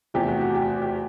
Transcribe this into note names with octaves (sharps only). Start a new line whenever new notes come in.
E2 C3 F3 A3 G4
F#4
F#4
G4
F#4
G4